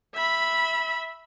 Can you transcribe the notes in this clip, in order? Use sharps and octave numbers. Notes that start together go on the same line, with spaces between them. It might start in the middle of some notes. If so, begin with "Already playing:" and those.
E5 B5